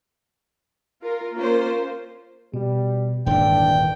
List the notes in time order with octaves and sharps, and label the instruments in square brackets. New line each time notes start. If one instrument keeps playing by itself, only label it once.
[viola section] F4 A#4
A#3 C#4 F4 A#4 C5
[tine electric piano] B2 [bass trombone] G3
[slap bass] D#1 D3 E3 [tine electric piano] G#2 [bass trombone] D4 [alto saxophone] G5